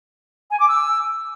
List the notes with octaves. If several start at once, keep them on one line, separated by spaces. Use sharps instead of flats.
G#5
D6
E6